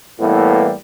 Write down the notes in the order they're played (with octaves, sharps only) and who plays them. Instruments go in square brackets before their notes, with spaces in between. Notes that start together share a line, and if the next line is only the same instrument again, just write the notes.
[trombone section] A2 E3 G3 A#3 B3